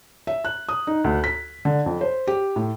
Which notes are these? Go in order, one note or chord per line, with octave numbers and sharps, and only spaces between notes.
E5
F#6
D#6
D#4
D2
B6
D3
F2
C5
G4
A2